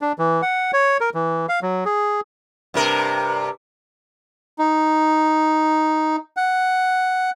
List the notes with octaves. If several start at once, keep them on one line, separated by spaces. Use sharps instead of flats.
D4
E3
F#5
C#5
A#4
E3
F5
F#3
G#4
G2 C3 A#4
D#4
F#5